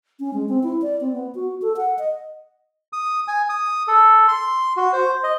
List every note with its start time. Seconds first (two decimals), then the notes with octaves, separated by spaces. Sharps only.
0.20 C#4
0.34 G#3
0.49 C4
0.63 E4
0.82 D5
1.01 C4
1.13 B3
1.35 F#4
1.62 A4
1.77 F#5
1.99 D#5
2.93 D#6
3.28 G#5
3.49 D#6
3.88 A4
4.28 C6
4.77 F#4
4.93 C5
5.24 D#5